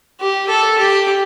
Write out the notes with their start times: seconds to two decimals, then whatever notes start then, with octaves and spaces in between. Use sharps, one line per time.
0.20 G4
0.49 A4
0.78 G4